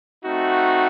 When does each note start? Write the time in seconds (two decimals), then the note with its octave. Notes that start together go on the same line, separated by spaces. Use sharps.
0.23 A3 C4 D#4 F#4